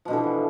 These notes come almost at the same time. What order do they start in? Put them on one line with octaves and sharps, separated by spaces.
F3 B2 D3 E3